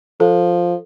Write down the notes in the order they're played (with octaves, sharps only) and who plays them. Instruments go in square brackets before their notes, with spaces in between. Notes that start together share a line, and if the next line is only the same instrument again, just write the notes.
[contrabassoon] F3 [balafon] A4